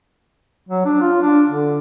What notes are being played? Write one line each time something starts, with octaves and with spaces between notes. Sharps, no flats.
F#3
D4
F4
D4
D3